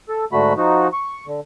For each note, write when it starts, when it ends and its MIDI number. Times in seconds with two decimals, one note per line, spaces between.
0.09 0.25 69
0.32 0.53 44
0.32 0.53 50
0.32 0.53 57
0.32 0.53 66
0.32 0.53 83
0.57 0.88 53
0.57 0.88 63
0.57 0.88 66
0.93 1.26 85
1.27 1.40 50